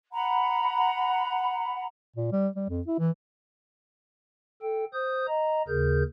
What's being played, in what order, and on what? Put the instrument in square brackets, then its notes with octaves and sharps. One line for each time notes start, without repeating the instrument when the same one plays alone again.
[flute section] F#5 A#5 B5
[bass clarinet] A#2
G3
G3
F2
E4
E3
[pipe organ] A4 G5
C5 D#6 G6
D#5 A#5
D#2 C#3 G#4 A#4 G6